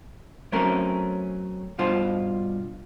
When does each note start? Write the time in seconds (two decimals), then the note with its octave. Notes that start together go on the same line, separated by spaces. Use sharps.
0.52 F#3 A3 C4 C#4 A#4
1.78 G2 B2 F4 C5